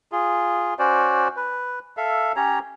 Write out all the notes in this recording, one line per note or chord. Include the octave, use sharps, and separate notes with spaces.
F4 G#4
C#4 F#4 C5 D5
B4
A4 E5 F5
C#4 G4 C#5 A#5